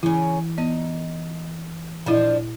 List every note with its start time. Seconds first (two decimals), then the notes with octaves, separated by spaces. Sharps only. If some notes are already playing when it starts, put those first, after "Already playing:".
0.03 C#3 E3 C#4 E4
0.58 B3 D#4
2.06 A#2 F3 D4 E4 D#5